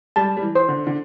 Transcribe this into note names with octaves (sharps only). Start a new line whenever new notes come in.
G3 A5
G3
E3
C5
D3
D3